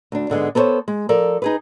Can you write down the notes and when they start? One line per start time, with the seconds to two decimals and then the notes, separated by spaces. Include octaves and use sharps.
0.12 D2 D4
0.30 G#2 D3 G#3 B3
0.55 B3 A4 A#4 C5 C#5
0.88 G#3
1.09 F3 A4 A#4 D5
1.42 D#4 G#4 B4